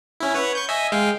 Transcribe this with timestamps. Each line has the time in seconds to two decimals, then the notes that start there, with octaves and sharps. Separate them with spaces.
0.20 C#4 E4
0.34 B4 C#5 F#5
0.55 C#6 G6
0.69 D#5 E5 G#5
0.92 G#3 F5 G5